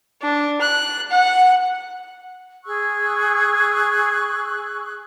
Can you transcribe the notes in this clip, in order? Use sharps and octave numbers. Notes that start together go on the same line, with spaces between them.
D4
F#6
F#5
G#4 C#6 E6 F#6